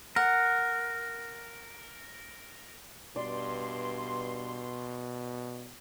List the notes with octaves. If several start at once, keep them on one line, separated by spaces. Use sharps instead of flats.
A#4 F#5
G2 B2 D5 C6